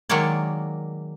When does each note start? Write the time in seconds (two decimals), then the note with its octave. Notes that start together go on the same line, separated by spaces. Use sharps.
0.09 D#3 F#3 G#3 A#3 C#5 D5